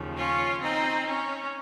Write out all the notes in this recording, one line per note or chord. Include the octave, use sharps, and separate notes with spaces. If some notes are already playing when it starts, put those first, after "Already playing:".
Already playing: D#2 C#3 F3
C#4 F4
C4 D#4
C#4